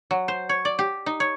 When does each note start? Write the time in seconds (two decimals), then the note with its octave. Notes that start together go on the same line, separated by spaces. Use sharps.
0.11 F#3
0.28 C5
0.49 C#5
0.65 D5
0.79 G4
1.06 D#4
1.20 C#5